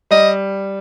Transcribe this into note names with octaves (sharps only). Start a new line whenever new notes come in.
G3 D#5